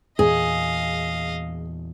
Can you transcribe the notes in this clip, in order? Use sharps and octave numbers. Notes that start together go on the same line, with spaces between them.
E2 A#2 E3 G#4 D#5 F5